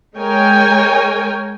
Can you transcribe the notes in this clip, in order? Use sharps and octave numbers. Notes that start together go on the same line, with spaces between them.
G#3 A#4 C#5 G5 G#5